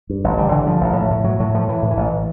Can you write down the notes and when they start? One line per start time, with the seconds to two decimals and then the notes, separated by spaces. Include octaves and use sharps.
0.10 G2
0.24 A1
0.38 D3 G3
0.52 D3 E3
0.67 G2 F3
0.81 A1
0.96 A2
1.10 A2
1.24 A2 F#3
1.39 A2 F#3
1.54 A2 F3
1.68 A2 E3
1.82 A2
1.91 E3
1.97 A1